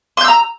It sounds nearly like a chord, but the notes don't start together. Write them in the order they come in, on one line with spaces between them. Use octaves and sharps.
C6 G6 E6 A#5